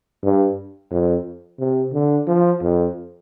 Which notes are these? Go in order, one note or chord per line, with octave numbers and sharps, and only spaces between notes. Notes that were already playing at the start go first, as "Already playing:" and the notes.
G2
F2
C3
D3
F3
F2